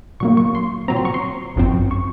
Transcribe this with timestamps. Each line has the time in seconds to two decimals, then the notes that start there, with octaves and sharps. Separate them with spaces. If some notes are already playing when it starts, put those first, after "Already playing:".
0.20 A#2 F#3 A#3 C#6
0.37 C#6
0.55 C6
0.88 A#2 F#3 C4 A#5
0.97 C6
1.05 C#6
1.14 C6
1.56 G#1 F#2 F3 C4
1.91 C#6